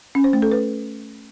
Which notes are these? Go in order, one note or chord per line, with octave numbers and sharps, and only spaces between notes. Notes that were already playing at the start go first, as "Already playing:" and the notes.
C#4
C5
A3
A4
B4